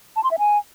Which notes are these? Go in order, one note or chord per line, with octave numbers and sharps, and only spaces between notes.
A5
C6
E5
G#5